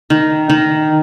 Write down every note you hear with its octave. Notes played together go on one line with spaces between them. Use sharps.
D#3
D#3